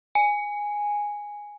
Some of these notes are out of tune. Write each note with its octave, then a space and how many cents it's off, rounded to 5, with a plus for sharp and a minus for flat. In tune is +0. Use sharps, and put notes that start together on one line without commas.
G#5 -5